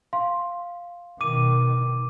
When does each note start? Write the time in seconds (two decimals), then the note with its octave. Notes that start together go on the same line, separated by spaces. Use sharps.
0.13 F5 C6
1.21 B2 D#3 D6 D#7